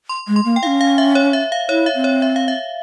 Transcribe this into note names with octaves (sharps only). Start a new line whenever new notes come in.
C6
G#3
C6
A#3
G5
E4 F5
C#4
F5
E5
C#5
E5
F5
E4 C#5
E5
C4
C#5
E5
F5
E5